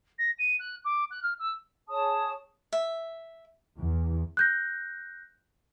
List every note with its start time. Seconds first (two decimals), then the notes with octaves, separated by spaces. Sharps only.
0.18 A#6
0.38 D#7
0.59 F#6
0.84 D6
1.10 F#6
1.22 F6
1.39 E6
1.89 G#4 C#5 A5 D#6
2.73 E5
3.78 E2
4.37 F#6 G6 A#6